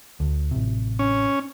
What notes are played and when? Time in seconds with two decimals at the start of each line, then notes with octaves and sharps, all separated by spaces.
0.20 D2
0.51 A1 C3
0.99 C#4